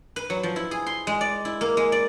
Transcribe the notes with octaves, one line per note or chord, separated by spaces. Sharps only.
B4
F#3
F3
E4
G#4
C6
G#3
D5
E4
A#3
G#3
D5